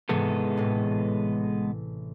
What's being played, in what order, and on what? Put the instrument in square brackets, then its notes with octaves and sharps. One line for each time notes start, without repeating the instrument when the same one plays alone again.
[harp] G#2 C3 E3 [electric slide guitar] G#3 B3 A4
[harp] A1 A2